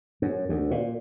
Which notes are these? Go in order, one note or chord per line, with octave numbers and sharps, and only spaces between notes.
F#2
D2
A#2